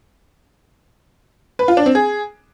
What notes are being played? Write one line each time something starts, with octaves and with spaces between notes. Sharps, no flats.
B4
F4
D4
C4
G#4